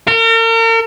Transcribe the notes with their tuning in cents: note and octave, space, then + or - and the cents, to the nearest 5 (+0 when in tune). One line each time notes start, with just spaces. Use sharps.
A#4 -40